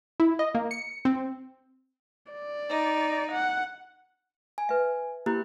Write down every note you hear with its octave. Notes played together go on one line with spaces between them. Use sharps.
E4
D#5
A#3
C#7
C4
D5
D#4
F#5
G#5
B4 E5
A#3 E4 G4 F#6